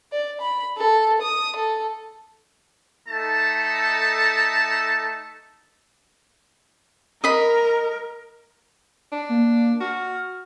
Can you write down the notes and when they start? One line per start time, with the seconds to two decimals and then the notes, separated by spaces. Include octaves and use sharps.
0.12 D5
0.41 B5
0.77 A4
1.22 D#6
1.56 A4
3.08 A3 D#4 A4 A5
7.24 A#4 D#5 B5
9.12 D4
9.29 A#3
9.80 F#4 F6